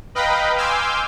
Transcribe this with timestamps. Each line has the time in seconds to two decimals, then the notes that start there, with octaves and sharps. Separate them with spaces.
0.15 B4 D#5 F5 G5 A#5 B5
0.57 G#5 C6 D6 E6 F6 G6